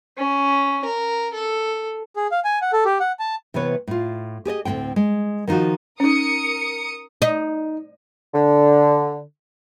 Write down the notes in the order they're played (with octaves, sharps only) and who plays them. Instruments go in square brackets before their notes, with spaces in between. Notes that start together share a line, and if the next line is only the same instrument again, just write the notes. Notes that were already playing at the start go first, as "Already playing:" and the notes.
[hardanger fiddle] C#4
A#4
A4
[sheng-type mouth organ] G#4
F5
G#5
F#5
A4
G4
F#5
A5
[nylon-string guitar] C3 E3 B3 B4 C#5
A2 F4
G4 G#4 D5 D#5
D2 A2 C3 C4 G5
G#3
D#3 F3 D#4 F4 F#4
[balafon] C#4 D#4 [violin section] A#4 D#6 C#7
[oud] D#4
[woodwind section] D3